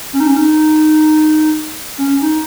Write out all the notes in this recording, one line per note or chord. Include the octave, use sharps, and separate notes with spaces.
C#4
D#4
C#4
D#4
C#4
D#4